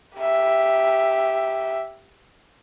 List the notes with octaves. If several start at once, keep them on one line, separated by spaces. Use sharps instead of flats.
G4 E5